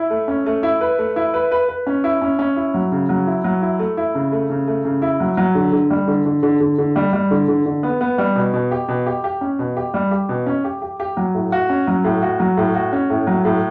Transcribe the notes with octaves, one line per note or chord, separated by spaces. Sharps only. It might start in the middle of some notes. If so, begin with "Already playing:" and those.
Already playing: E4
A3
C#4
A3
E4
B4
A3
E4
B4
B4
B4
C#4
E4
C#4
C#4
E4
F#3
C#3
F#3
E4
F#3
E4
A3
E4
C#3
A3
C#3
A3
C#3
E4
F#3
F#3
D3
D3
G3
D3
D3
D3
D3
D3
G3
G3
D3
D3
D3
B3
B3
G3
B2
B2
G4
B2
G4
G4
C#4
B2
G4
G3
G4
B2
C#4
G4
G4
G4
F#3
A2
F#4
C#4
F#3
A2
F#4
F#3
A2
F#4
C#4
A2
F#3
A2